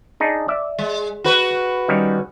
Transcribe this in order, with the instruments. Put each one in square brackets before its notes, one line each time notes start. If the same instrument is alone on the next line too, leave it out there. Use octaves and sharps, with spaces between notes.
[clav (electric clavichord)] D4 D#4 G#4
D5 E5
[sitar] G#3
F#4 B4
[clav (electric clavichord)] D#3 G3 C#4